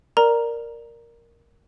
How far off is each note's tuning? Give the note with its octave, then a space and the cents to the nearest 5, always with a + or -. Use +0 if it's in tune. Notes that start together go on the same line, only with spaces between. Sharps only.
A#4 +0 D5 +10 A#5 +5